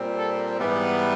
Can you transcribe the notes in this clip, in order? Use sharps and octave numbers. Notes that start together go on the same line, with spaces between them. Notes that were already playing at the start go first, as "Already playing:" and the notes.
Already playing: A#2 G3 C4
A4
G#2 E3 G3 B3